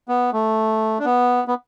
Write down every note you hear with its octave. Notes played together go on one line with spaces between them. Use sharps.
B3
A3
D4
B3
B3